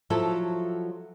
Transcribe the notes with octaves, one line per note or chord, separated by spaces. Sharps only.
F3 F#3 E4 A4 E5